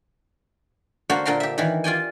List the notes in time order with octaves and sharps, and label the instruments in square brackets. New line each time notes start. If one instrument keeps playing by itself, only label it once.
[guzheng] D3 A#3 F#4 C5 F#5
A#2 D3 A#4 G5 A#5 C6
G4 E5
D#3 E3
F4 D5 G5 G#5